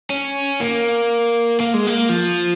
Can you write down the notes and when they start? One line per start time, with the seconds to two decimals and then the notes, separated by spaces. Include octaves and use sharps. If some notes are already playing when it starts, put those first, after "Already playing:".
0.10 C#4
0.61 A#3
1.60 A#3
1.74 G#3
1.87 A#3
2.09 F3